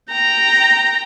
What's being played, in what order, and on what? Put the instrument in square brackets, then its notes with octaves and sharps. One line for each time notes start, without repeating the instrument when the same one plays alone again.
[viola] G5 A#5